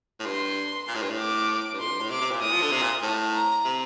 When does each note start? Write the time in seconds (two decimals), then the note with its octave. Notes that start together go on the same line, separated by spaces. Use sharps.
0.20 A2
0.26 G2 C6
0.88 A#2
0.95 A2
1.03 G2
1.10 A2
1.18 D6
1.73 G2
1.80 F2 C6
1.90 G2
2.00 A2
2.10 C3 D6
2.21 C3
2.31 A#2
2.41 A2 D#6
2.52 F3
2.62 D3
2.72 C3
2.82 A#2
3.02 A2 A5
3.34 A#5
3.65 C3